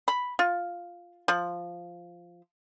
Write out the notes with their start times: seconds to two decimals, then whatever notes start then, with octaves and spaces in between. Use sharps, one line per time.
0.08 B5
0.39 F4
1.28 F3